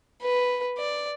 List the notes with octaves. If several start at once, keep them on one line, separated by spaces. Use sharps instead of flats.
B4
D5